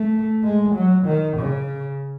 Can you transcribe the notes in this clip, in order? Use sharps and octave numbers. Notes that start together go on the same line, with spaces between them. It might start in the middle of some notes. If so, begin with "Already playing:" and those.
Already playing: A3
G#3
F#3
D#3
C#3